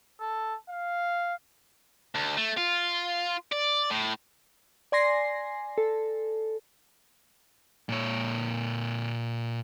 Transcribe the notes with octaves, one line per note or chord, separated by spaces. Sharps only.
A4
F5
D2
A3
F4
D5
A2
D5 G#5 C6 A#6 C7
A4
A#2 C#5